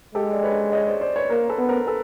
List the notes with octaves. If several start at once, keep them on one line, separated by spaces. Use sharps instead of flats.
G#3 G4 A4
D5
B4 C#5
C#5 D#5
C5 D5
C5 D5
B4 C#5
A#3 A#4 C5
A4 B4
B3
A#4 C5
A4 B4